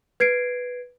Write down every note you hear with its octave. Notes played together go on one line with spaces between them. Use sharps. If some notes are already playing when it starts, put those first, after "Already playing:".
B4 G#6 C7 D7